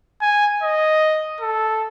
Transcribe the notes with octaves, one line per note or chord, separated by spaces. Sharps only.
G#5
D#5
A4